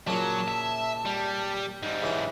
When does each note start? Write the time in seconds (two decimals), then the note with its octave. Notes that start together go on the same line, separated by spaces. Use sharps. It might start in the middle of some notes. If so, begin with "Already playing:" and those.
0.07 A#2 C#3 F#3 C#4 A5
0.48 E5
1.05 G3
1.82 G#2 G3
2.02 C#3 E3 C#4